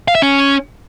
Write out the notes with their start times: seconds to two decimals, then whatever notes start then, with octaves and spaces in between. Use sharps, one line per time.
0.08 F5
0.15 E5
0.22 C#4